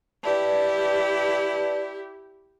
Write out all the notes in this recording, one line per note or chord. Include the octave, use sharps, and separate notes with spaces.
E4 G4 B4 D5 A5